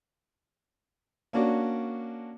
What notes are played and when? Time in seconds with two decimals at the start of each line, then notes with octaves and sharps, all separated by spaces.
1.33 A#3 C#4 D4 F#4